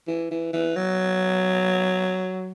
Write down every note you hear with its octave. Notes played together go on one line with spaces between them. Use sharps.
E3
E3
E3
F#3